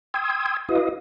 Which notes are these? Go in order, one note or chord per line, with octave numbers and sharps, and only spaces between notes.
G5 C6 D#6 E6 G#6
E4 F#4 B4 D#5 F5 D#6